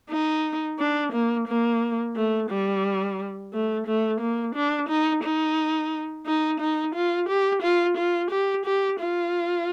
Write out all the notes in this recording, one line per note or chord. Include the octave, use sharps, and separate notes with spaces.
D#4
D4
A#3
A#3
A3
G3
A3
A3
A#3
D4
D#4
D#4
D#4
D#4
F4
G4
F4
F4
G4
G4
F4